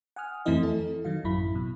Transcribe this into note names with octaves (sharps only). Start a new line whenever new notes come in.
F#5 G#5 D#6 F6
F2 E3 A3 C4 E4 D#5
A4
D#3 F#3 F5
A1 F#2 E4 B5
B2